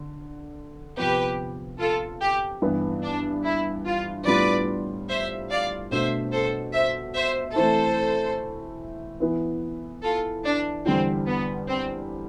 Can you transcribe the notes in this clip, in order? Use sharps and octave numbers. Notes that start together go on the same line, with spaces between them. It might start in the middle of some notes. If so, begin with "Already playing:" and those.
Already playing: D3
C3 F3 B3 G4 B4
F4 A4
G4
G2 E3 B3 E4
D4
E4
F4
A2 G3 B3 D4 F4 B4 D5
C5 E5
D5 F5
B2 A3 D4 C5 E5
A4 C5
C5 E5
C5 E5
E3 A3 C4 E4 A4 C5
E3 B3 E4
F4 A4
D4
E2 D3 G3 C4
B3
C4